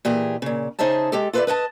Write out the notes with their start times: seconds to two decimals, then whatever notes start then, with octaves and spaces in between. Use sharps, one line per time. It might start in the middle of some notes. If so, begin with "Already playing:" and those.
0.05 A#2 E3 G4 G#4
0.42 A#2 C#3
0.79 C#3 D#4 G#4 C5 E5 A5
1.12 G#3 G4 A4
1.33 F4 A4 B4 C5 D5 E5
1.47 B4 D#5 F#5 A5